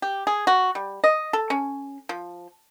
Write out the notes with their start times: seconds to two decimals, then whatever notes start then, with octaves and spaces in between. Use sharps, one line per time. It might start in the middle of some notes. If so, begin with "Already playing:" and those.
0.02 G4
0.27 G#4
0.47 F#4
0.75 G3
1.04 D#5
1.33 A4
1.50 C#4
2.09 F3